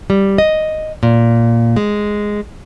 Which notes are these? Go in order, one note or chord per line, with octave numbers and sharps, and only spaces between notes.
G3
D#5
A#2
G#3